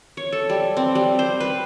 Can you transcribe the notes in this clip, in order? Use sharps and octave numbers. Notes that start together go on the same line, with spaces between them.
C#5
A4
G3
C4
G3
C5
B4